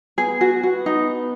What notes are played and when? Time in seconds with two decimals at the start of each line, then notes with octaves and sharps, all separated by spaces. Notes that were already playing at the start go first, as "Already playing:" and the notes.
0.18 B3 G#4
0.41 F#4
0.63 B3 F#4
0.86 D#4